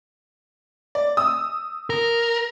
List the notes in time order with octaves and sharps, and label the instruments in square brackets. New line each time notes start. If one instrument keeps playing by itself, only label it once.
[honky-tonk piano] D5
D#6 E6
[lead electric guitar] A#4